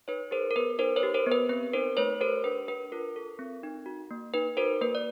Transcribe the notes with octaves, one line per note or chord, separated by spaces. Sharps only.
D#4 B4 C#5
G#4 A#4 C5
A#4
B3 B4
D#4 A#4 C5
B4 C#5
G4
A#4 C5
B3
B4
C4 B4
D#4 A#4 C5
A3 B4 C#5
G4 A#4 C5
D4 B4
D4 B4
F4 A#4
A4
C4
D#4
F#4
A#3
D#4 B4
F#4 A#4 C5
A#3 B4
D5